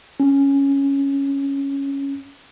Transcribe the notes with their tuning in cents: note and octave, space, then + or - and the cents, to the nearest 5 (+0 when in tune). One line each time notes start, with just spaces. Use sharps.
C#4 +0